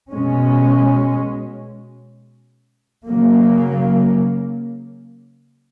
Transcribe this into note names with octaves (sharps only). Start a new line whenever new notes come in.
B2 G#3 C#4
C#3 F#3 A#3